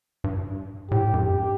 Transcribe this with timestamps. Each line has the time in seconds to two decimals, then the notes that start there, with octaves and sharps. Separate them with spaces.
0.24 G2
0.90 A2 G4
1.01 G2
1.14 F#2
1.24 G2 G4